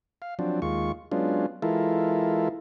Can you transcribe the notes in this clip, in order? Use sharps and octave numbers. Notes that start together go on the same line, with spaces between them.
F5
F3 F#3 C4 D4
D#2 G#3 F4 C#6
F#3 G#3 B3 C#4 D4 F4
E3 G#3 E4 F4 A4 A#4